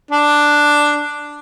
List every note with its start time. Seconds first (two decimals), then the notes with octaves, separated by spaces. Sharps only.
0.11 D4